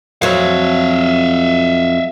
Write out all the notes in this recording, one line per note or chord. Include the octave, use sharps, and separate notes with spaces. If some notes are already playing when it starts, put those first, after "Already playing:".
F2 F#3 C4 E5 F5